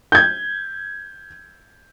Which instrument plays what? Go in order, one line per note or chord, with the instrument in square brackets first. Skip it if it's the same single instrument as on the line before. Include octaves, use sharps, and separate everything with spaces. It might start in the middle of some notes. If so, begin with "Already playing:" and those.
[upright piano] G6 G#6